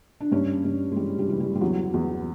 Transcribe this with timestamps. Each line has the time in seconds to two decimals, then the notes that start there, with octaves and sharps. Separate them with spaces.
0.21 D4
0.32 G2 C#4
0.64 G2
0.92 G#3
0.96 E3 G3
1.19 G3
1.29 E3
1.40 G3
1.55 G3
1.61 E2 F#3
1.94 E2